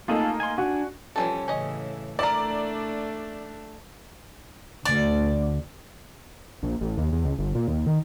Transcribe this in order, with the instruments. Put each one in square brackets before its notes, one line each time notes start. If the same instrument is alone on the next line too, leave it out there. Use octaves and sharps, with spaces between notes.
[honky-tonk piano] A3 A#3 D#4 [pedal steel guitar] F4 G#4 A4
[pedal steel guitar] G#5 C6
[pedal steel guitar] D4 G#5 [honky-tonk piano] F#4
[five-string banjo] E3 G#3 A4 [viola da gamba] F3 G3 C#4
[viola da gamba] A2 C#3 E3 [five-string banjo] C#4 D#5
[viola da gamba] A3 D4 [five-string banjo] E4 A#4 [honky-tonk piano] D5
[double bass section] D2 [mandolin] D5
[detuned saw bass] A#1
A1
D#2
E2
C#2
G1
A#2
D#2
D#3